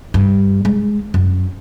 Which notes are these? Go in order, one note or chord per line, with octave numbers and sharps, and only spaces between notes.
G2
G#3
F#2